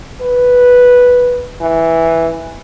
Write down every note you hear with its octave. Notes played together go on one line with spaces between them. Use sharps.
B4
E3